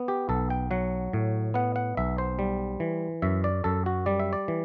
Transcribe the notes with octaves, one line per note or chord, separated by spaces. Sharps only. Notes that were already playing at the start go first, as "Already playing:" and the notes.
Already playing: B3
G4
B1 A4
G5
F#3 F#5
A2
B3 F#5
F#5
B1 E5
C5
G3
E3
F#2 E5
D5
F#2 A4
F#4
G3 D5
E5
D5
E3